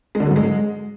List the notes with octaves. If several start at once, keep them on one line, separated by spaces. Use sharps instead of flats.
G#3
D3
F#3
G#2
G#3